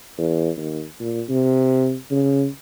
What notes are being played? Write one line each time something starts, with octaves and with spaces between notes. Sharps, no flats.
E2
D#2
A#2
C3
C#3